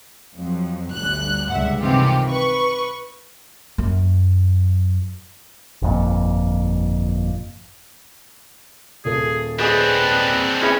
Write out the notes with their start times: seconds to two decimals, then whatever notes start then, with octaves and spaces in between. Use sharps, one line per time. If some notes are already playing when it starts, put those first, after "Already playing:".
0.35 F2 F#3
0.93 G1 D2 F#6
1.50 C#2 G2 E5 F#5
1.80 C3 D#3 E3 C4 F4 G4
2.27 B4 C#6
3.78 F#2
5.82 G1 F2 A#2
9.05 D#1 G#4 A4
9.59 B3 C4 D4 G#4 B4 D#5
10.62 C#4 E4 G#4 B4